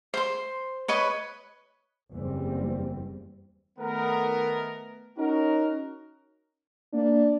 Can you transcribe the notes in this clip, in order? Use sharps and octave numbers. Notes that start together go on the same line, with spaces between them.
C5 C6
B4 C#5 D#5 B5
F#1 E2 E3 G3 C4
D#3 A3 B3 A#4
C#4 D#4 F#4 A#4
A#3 D4